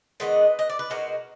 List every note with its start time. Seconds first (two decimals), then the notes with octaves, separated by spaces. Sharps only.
0.20 D#3 G#3 B3 D4 B4 D#5
0.59 D#5
0.70 D5
0.79 B4
0.90 B2 G#3 D#4 F#4 A#4